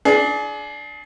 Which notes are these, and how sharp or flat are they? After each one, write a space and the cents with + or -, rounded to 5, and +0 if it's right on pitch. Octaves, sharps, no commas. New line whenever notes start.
D4 +0 G#4 +35